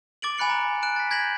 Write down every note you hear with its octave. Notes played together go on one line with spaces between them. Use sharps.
D6 A6 D7 F#7
G#5 B5 F#6 C#7 F#7
A#5
F#6 D7 E7
A6 B6
G6 G#6 A#6 B6 E7 F#7